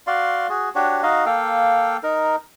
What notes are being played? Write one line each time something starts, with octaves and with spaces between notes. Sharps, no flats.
F#4 D5 F5 C6
F#4 G#4
D4 F#4 G4 C#5
D#4 F#4 D#5 F5
A#3 A4 F5 G5
D#4 A#4